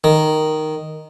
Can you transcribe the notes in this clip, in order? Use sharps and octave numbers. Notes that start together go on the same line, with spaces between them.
D#3